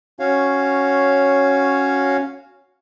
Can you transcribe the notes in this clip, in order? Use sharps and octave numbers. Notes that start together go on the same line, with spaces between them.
C#4 F#4 C#5 F5